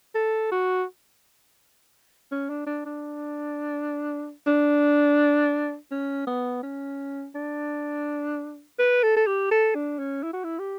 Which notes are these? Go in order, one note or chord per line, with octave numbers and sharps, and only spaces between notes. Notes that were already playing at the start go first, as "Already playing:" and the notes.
A4
F#4
C#4
D4
D4
D4
D4
C#4
B3
C#4
D4
B4
A4
A4
G4
A4
D4
C#4
E4
F#4
E4
G4